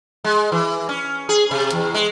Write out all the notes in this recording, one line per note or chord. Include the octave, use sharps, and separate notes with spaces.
G#3
E3
C#4
G#4
C3
E2
G#3